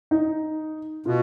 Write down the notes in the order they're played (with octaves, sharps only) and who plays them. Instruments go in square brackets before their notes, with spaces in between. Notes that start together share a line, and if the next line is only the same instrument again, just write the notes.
[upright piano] D#4
[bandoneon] B2 [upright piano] F4